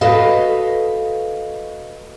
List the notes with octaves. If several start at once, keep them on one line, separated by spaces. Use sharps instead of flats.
F#4 A4 B4 D#5 F5